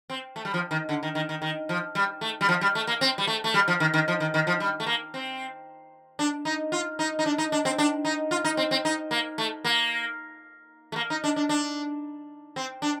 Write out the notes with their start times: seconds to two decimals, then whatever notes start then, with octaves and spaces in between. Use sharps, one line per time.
0.10 C4
0.36 A3
0.45 G3
0.54 F3
0.71 D#3
0.89 D3
1.03 D#3
1.15 D#3
1.29 D#3
1.42 D#3
1.69 F3
1.95 G3
2.21 A3
2.41 G3
2.49 F3
2.61 G3
2.75 A3
2.87 A#3
3.01 C4
3.18 G3
3.27 A3
3.44 A3
3.54 G3
3.68 F3
3.80 D#3
3.94 D#3
4.08 F3
4.20 D#3
4.34 D#3
4.47 F3
4.60 G3
4.80 A3
4.86 A#3
5.14 C4
6.19 D4
6.45 D#4
6.72 F4
6.99 D#4
7.19 D#4
7.26 D4
7.38 D#4
7.52 D4
7.65 C4
7.78 D4
8.05 D#4
8.31 F4
8.44 D#4
8.57 C4
8.71 C4
8.85 D#4
9.11 A#3
9.38 A3
9.65 A#3
10.92 A3
10.96 A#3
11.10 D#4
11.24 D4
11.36 D4
11.49 D4
12.56 C4
12.82 D4